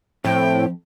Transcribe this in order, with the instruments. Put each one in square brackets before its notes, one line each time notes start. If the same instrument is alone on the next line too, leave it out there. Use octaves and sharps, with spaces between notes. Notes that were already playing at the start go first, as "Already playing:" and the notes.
[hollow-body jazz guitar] F2 [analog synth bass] A2 [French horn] C4 [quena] G5